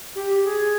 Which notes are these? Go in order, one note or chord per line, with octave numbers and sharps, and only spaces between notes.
G4
G#4